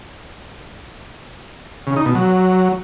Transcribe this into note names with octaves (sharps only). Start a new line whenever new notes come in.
C#3
D#4
B2
F#3